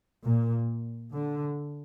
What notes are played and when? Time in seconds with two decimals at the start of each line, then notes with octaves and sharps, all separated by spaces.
0.23 A#2
1.13 D3